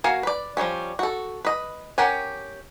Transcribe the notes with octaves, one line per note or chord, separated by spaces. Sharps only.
A#3 F#4 F5 G#5
B4 D5
F3 G3 G#3 C#4
F#4 A4
B4 D#5
C#4 G4 A#4 F#5 G#5